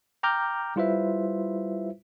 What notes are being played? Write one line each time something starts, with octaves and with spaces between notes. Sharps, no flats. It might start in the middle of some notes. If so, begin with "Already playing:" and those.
G5 A#5 D6 F6 G6
G3 E4 F4 B4 C5 E5